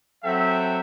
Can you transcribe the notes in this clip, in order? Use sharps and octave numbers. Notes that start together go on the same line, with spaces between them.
F#3 C4 A4 E5 F#5 G5